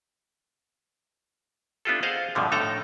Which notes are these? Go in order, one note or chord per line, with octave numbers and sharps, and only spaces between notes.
B3 D4 E4 F4 G4 A4
G#4 C5 D#5 F5 F#5
G2 B2 D3 F3
A2 D3 D#4 A4 G5 A#5